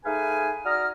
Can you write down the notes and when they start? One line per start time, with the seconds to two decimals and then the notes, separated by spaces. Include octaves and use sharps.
0.05 A3 D#4 G#4 B4 F5 G#5
0.66 F#4 D5 A#5 D#6 F6